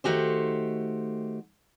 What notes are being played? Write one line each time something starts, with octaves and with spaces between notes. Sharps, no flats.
D#3 A3 F#4 G4 C5